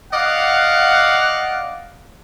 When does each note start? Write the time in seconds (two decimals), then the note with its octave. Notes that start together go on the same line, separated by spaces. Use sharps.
0.13 D5 D#5 F5 F#5